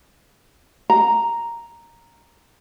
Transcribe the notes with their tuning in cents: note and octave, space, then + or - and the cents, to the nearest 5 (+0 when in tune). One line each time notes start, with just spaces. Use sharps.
A#5 +0